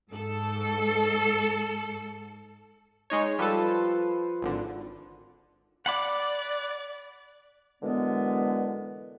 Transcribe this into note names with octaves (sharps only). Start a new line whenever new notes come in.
G#2 A4
G#3 D#4 C#5
F3 G3 A4 B4 C5
G#1 D3
D5 F#5 B5 D6
F#2 D3 E3 G#3 B3